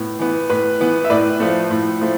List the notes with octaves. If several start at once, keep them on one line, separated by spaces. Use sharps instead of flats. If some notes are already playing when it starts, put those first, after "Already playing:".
Already playing: A2 B3
E3 B3
A2 B4
E3 B3
E5
A2 B4 D5
F3 A3
A2
F3 A3